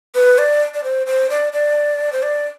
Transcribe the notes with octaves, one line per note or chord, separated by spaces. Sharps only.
B4
D5
D5
C5
C5
D5
D5
C5
D5